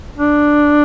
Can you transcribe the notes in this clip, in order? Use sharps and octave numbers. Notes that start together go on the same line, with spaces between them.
D4